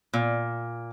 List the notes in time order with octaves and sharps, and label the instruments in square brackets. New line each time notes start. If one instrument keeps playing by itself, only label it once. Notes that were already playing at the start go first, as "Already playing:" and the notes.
[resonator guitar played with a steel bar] A#2